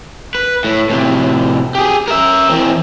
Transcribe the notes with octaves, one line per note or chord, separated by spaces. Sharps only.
B4
A2
A2 C3
G4 G#4
A#4 E5
E3 C4